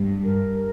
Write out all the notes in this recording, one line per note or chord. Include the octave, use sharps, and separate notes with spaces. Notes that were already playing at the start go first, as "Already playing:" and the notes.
Already playing: G2
A#4